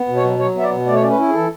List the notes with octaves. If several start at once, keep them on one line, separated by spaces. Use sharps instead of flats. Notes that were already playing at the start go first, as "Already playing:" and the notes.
Already playing: B3
B2
C#5
F#3
F#3 C#5
B3 E5
D5
B2
A3 D5
C#5
C#4 D5
B4
E4
G#4
E3 A4